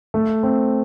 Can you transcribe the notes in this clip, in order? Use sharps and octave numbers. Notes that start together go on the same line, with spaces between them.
A3
C4